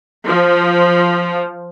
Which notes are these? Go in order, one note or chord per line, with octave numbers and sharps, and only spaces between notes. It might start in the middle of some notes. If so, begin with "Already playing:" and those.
F3